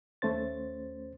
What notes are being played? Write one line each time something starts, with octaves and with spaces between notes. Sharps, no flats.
D#2 A3 C#4 C5 A6